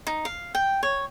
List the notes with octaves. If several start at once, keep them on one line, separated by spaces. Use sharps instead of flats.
D#4
F5
G5
C#5